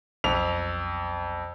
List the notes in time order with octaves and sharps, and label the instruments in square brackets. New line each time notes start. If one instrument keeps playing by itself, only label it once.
[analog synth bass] B1 [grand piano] F2 F7